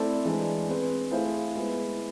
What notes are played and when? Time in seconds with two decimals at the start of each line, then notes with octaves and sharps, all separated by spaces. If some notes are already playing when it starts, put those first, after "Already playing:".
Already playing: A3 C4 E4 A4 D5
0.25 E3 G#3 D4
0.68 C4 G#4 B4
1.11 A3 E4 G#4 C5 F5
1.54 G#3 B3 E4